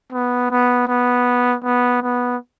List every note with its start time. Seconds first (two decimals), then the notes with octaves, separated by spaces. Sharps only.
0.12 B3
0.51 B3
0.88 B3
1.64 B3
2.03 B3